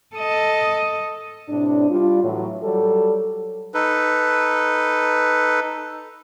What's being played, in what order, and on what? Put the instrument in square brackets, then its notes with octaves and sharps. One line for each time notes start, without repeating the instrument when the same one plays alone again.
[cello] A4 D#5
[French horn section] A2 C3 D4
G3 D4 F4
A2 E3 F#3
F#3 G3 A4
[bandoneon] D#4 A4 B4